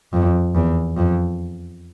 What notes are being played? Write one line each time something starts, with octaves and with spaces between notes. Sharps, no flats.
F2
E2
F2